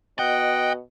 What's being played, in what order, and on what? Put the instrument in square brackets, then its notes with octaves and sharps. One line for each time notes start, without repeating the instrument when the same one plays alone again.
[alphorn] B2 [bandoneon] D#5 F#5 [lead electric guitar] G5